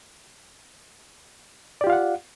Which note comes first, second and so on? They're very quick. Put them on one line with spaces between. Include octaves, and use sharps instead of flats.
D5 G4 F4 F5 F#5